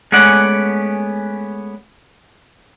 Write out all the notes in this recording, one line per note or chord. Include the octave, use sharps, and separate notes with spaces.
G#3 A3 B3 C#4 D5 F#5